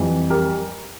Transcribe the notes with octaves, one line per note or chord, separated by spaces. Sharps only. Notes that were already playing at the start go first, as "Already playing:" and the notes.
Already playing: F2 E3 G3
G4 A#4